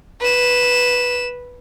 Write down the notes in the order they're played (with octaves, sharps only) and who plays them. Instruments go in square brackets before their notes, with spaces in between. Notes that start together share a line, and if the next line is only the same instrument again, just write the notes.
[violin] B4 E7